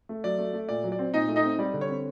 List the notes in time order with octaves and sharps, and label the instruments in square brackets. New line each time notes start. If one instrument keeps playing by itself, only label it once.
[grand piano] A3
F#3 D5
A3
A3
A#2 D5
F#3
D5
C4
A#2 D#4 D#5
A3
D#4 D#5
C4
G3 D5
D3
C#5
C4